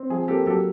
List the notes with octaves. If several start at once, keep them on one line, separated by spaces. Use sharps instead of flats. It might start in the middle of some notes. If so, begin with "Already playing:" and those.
Already playing: C4
F3 G#4
A#3 G4 A4
F#3 G4 A4